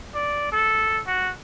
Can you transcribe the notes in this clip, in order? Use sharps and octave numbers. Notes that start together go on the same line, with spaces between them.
D5
A4
F#4